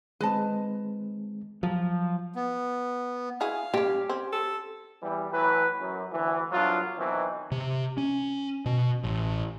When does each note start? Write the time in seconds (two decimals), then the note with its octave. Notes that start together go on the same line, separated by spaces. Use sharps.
0.21 D#3 G#3 C4 B4 D#5 A5
1.63 F3 F#3
2.35 B3
3.41 E4 F#4 G#4 F5
3.74 G3 C#4 G4
4.09 C4 C#4
4.33 A4
5.02 E2 E3 G3
5.32 A2 E3 F#3 B4
5.80 F#2
6.12 D2 E3
6.52 C2 F#3 B3 D4 F4
6.97 B2 D#3 E3 F#3 C4
7.52 C3
7.98 C#4
8.66 B2
9.04 A1